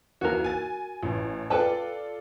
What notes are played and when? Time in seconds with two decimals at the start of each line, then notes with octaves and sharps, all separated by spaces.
0.21 D#2 E3 F#4 A#4
0.44 G#5 A6
1.03 A1 E3
1.50 F4 A4 B4 D5 G5 A5